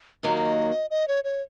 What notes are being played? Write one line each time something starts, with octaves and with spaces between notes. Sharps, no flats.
D#2 D#3 F#3 A#3 D#5
D#5
C#5
C#5